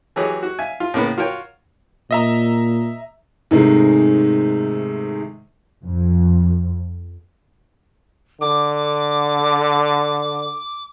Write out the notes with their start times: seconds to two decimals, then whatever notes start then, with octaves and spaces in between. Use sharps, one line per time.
0.16 E3 F#3 G4 G#4 C#5
0.43 F#4
0.59 E5 F5 G#5
0.80 F4
0.94 A2 C#3 A#3 B3
1.18 F4 F#4 A#4 C#5 G5
2.11 A#2 D#5 E5 A#5
3.51 G#2 C3 D#3 G#3 A3
5.84 F2
8.41 D3 D6